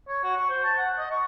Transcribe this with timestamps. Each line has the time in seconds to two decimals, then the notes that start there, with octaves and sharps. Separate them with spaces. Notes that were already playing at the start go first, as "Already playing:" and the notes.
0.08 C#5
0.24 F#4
0.36 C#6
0.50 C5
0.64 A5
0.78 F#5
0.98 D#5
1.11 C#6